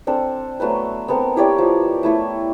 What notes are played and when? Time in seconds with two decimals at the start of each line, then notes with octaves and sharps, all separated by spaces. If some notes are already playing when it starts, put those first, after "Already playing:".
0.07 C4 D4 A4
0.60 F#3 A3 B3 B4
1.08 B3 C4 A4 A#4
1.36 E4 G4 C#5 D5
1.58 F3
2.03 A3 E4 A4